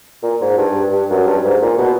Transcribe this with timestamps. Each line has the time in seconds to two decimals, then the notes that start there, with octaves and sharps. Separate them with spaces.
0.23 A#2
0.41 G#2
0.57 G2
0.92 G2
1.10 F#2
1.27 G2
1.44 G#2
1.61 A#2
1.78 B2